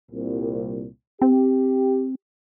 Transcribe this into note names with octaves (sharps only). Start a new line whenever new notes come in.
C2 A#2
C4 G4